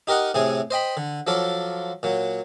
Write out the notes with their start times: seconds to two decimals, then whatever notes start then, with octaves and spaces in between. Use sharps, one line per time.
0.07 D#4 G4 A#4 D#5 F#5
0.34 A2 C3 G#4 G#5
0.71 C5 D#5 G5 B5
0.97 D3
1.27 F3 F#3 F4 A4 D5
2.03 A#2 F#3